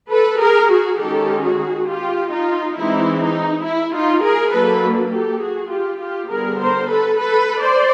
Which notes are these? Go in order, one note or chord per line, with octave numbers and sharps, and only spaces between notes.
A4 B4
G#4 A#4
F#4 G#4
D#3 G#3 C#4 G4 A4
F#4 G#4
F4 G4
D#4 F4
E3 G#3 C4 D#4 E4
D#4
E4
D#4 F4
G#4 A#4
F#3 A#3 D4 A4 B4
G4 A4
F#4 G#4
F4 G4
F4 G4
D3 G3 B3 G#4 A#4
A#4 C5
A4 B4
A4 B4
C5 D5